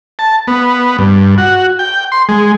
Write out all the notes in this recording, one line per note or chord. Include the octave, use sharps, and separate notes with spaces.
A5
B3
G2
F#4
G5
C6
G#3